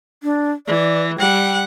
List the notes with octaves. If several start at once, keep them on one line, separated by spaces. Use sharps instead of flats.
D4
E3 D5
G3 F#5 G5